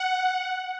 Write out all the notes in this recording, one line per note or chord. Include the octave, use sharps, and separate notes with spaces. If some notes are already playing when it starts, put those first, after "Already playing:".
Already playing: F#5